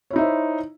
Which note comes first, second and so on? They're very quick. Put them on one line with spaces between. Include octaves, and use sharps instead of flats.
C#5 E4 D#4 E5 C5